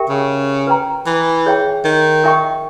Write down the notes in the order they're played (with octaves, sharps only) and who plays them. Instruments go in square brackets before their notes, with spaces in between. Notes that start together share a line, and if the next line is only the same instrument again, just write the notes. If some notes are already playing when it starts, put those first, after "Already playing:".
Already playing: [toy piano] G4 A#4 E5 G5
[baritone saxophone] C#3
[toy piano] B4 G5 A#5
[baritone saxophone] E3
[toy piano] G#4 C#5 E5 G5 B5
[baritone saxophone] D#3
[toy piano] A#4 E5 G5 C#6